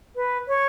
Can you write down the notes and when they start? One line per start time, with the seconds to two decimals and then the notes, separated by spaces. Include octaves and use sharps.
0.16 B4
0.48 C#5